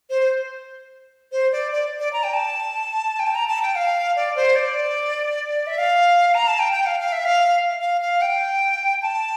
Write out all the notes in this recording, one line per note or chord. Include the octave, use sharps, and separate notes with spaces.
C5
C5
D5
D5
D5
A#5
G5
A5
G5
A5
A#5
A5
G5
F5
D5
C5
D5
E5
F5
A#5
A5
G5
G5
F5
F5
E5
F5
F5
F5
G5
A5